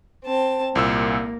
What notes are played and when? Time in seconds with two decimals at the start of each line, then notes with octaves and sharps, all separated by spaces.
0.25 C4 A5
0.75 C2 A#2 A#3 E6